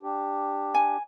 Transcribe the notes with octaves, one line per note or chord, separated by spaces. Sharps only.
D4 G4
G#5